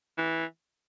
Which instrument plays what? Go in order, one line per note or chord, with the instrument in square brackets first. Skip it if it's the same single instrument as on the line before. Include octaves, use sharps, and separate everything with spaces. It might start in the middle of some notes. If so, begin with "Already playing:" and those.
[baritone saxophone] E3